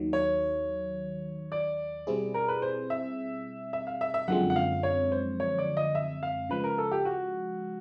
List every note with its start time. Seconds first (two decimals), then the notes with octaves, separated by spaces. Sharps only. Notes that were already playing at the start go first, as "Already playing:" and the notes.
Already playing: D#2 D#3 F#3
0.13 C#5
1.52 D5
2.07 B2 G3 C4 E4 G#4
2.34 A#4
2.48 B4
2.62 C5
2.90 E5
3.73 E5
3.87 F5
4.01 E5
4.14 E5
4.28 F#2 D3 F3 G#3 C4 F#5
4.50 F#5
4.56 F5
4.83 C#5
5.12 C5
5.40 C#5
5.58 D5
5.77 D#5
5.95 E5
6.23 F5
6.49 C#3 F3 G#3 B4
6.64 A#4
6.78 A4
6.92 G4
7.05 F#4